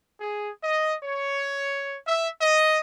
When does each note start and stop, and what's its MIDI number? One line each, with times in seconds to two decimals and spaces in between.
0.20 0.49 68
0.63 0.94 75
1.03 1.96 73
2.05 2.28 76
2.40 2.79 75